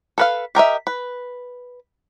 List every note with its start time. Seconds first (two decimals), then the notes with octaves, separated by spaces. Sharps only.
0.18 A4 B4 F5
0.55 G4 A#4 D#5 E5
0.87 B4